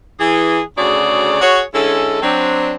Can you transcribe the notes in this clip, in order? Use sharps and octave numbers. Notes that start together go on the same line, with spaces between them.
E3 G#4
D2 C#3 F#4 G#4 C#5 D5
F#4 G#4 C#5
D3 G#3 C#4 E4 A4
F#3 C4 D4